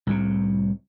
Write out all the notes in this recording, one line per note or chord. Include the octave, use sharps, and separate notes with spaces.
C2 A2 C3